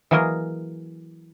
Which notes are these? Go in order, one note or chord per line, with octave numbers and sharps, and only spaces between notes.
E3 F#3 A#3 G#4 A#4 D#5